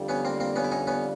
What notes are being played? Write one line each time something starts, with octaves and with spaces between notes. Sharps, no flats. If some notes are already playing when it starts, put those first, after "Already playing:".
Already playing: F2 D3 G3
B3 C#4
A#3 C4
A#3 C4
B3 C#4
E4
C#4 D#4
B3 C#4